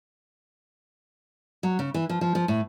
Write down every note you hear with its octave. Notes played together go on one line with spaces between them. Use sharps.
F#3
C#3
E3
F3
F3
F3
A2